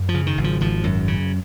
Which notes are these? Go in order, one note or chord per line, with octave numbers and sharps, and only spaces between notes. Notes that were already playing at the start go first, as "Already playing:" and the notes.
Already playing: F#2
F3
C#3
D#3
G#1
F3
G#1 F3
F#2
C#3